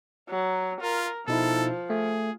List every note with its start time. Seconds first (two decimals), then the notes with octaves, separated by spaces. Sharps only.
0.30 F#3
0.81 F4 A#4
1.28 B2 F3 D#4 E4 A4
1.90 A3 G#4